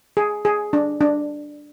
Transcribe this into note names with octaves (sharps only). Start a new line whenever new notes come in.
G#4
G#4
D4
D4